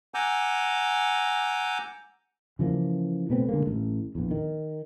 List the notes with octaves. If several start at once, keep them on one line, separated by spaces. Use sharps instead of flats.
F#5 G#5 A#5 D6 E6 G6
C#3 E3 F3 A#3
B2 A3 B3 C4
D3 G#3 A#3
A1
A#1 E2
D#3